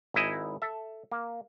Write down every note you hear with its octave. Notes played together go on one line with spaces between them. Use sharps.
G#1 D#4 E4 D#5 G#5
A4 E5
A#3